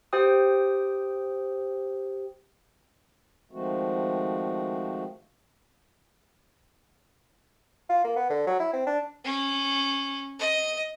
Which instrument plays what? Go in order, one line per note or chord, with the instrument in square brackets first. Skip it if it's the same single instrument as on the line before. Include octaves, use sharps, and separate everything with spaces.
[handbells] G4 C5 G5 D#6
[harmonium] D#3 F3 G#3 A3 C4 F#4
[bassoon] F4
A#3
B3
D3
F#3
E4
C4
D4
[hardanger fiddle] C#4
D#5